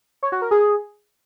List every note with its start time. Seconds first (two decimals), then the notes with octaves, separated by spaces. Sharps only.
0.23 C#5
0.32 F#4
0.42 A#4
0.51 G#4